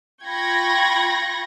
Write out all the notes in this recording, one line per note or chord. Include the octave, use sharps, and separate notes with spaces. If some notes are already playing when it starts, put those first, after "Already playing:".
F4 G5 B5 C#6 G#6 A#6